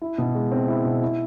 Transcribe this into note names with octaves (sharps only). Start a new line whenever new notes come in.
E4
B2
G#3
C4
E4
B2
E4